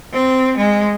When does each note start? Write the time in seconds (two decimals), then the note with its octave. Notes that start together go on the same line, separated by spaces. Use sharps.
0.13 C4
0.57 G#3